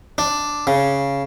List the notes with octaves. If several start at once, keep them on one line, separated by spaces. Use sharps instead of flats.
D4
C#3